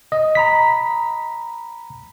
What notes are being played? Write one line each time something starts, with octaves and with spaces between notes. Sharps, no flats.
D#5
A#5 B5 B6